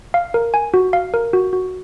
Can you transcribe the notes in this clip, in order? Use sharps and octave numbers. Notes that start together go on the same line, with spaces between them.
F5
A#4
G#5
F#4
F5
A#4
F#4
F#4